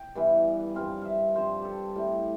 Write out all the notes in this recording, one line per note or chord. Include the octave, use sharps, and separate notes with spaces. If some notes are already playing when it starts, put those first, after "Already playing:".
Already playing: G5
G2 E3 B3
G2 F3 C4 F5
E5 F5
G2 F3 C4 C5
G4 A4
A2 G3 C4